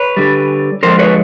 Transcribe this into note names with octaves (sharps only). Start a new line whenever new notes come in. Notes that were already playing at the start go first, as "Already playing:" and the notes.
Already playing: B4 C#5
D3 G3
D3 F3 G#3 A#4 C5
B4 C#5